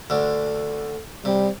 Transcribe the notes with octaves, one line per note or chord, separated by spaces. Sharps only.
D2 D3
C3 G3